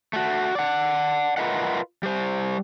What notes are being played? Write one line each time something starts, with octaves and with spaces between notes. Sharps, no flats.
A3 F#4
D5 F#5
F4 A#4 B4 D#5 E5 F#5
G3 C5